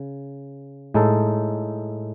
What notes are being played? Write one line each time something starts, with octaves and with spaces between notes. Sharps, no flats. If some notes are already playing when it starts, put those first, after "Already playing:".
Already playing: C#3
A2 G#3 D#4 A4